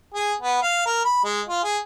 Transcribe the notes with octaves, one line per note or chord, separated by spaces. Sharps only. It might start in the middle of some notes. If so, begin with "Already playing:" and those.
G#4
B3
F5
A#4
B5
G#3
F4
G#4